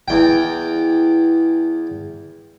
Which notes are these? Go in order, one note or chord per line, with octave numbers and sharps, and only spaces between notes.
E2 G5